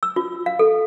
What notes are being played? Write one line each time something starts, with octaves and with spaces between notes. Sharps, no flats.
E6
F4
F5
A4